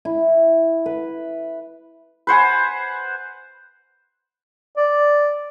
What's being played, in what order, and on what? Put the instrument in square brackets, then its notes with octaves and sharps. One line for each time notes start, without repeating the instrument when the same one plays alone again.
[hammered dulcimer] E4
B4
[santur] B4 C5 F#5 G#5
[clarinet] D5